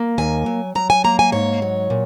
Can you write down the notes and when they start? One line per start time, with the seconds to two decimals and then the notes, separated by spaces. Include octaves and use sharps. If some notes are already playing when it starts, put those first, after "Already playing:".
Already playing: A#3
0.18 D#2 G#5
0.46 F#3
0.75 F#3 A#5
0.90 G#5
1.04 A#3 A#5
1.19 G#5
1.32 G#2 C#5
1.62 F#3
1.90 A#2